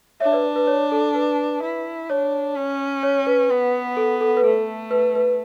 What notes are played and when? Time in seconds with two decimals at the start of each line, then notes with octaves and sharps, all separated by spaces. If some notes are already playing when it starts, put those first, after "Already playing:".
0.20 D4 C#5 E5
0.32 B4 D5
0.56 B4
0.67 C#5
0.92 A4
1.14 B4
1.62 E4
2.09 D4 C#5
2.56 C#4
3.03 C#5
3.27 B4
3.50 B3
3.97 A4
4.21 A4
4.37 B4
4.44 A3 A4
4.91 B4
5.15 B4